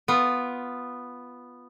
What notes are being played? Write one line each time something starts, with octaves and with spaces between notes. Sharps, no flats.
B3 F4